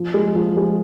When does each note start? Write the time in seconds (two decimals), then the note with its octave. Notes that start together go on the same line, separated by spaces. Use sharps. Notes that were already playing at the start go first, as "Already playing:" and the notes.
Already playing: F3
0.14 G#3
0.35 F3
0.57 G#3